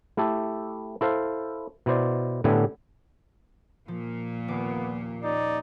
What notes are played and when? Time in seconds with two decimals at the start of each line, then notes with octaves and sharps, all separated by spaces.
0.17 A3 E4 G4 A4
1.01 E4 A4 C5 F5
1.86 B2 E4 C5 D5
2.44 A2 D3 B3 G4 E5 G#5
3.88 A#2 F3
4.48 D#1 B3 D6
5.24 C#4 D#4 G4 D5